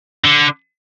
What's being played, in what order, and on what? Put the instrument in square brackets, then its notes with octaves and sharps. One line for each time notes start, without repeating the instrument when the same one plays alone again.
[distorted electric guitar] D3